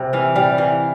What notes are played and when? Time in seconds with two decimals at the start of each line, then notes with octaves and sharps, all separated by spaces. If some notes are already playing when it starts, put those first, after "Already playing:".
Already playing: C3 G3
0.13 E3 F5
0.36 G3 F5
0.58 E3 F5